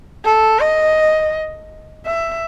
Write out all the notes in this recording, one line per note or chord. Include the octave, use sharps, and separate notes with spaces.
A4
D#5
E5